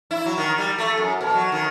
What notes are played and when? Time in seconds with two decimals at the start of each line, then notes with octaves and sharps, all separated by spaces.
0.11 E4
0.26 F#3
0.38 D#3
0.58 G3
0.78 A3
0.98 F#2
1.21 B2
1.34 F#3
1.52 D#3